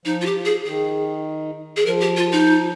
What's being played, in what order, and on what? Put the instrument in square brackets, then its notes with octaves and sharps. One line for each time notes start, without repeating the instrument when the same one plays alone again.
[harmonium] F3 [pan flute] D#4
[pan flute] F4
G4
[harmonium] F3
[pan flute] G#4
[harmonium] D#3 [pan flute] G#4
[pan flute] G#4
[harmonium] F3 [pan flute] A#4
[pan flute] G4
F4
D#4